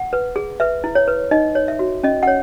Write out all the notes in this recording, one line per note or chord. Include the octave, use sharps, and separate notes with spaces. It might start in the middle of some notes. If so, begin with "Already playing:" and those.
Already playing: F#5
B4
G#4
B4 E5
E4
C#5
B4
D#4 D#5
C#5
E5
F#4
C#4 D#5
F#5
C#5